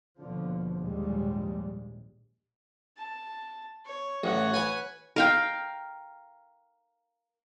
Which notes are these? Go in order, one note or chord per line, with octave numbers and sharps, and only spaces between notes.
D#2 B2 D3 F3
A#1 D#2 G#2 G3 G#3
A5
C#5
A1 C#5 F#5
B4 G#5
A#4 F5 G5